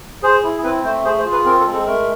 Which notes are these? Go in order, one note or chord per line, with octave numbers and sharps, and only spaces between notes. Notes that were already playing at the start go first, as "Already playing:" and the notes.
G#4 C5
E4
C4 B4
A3 C5
G#4 C5
C5
F4
B4
C4 A#4
A4
G#3
A4
A3 A#4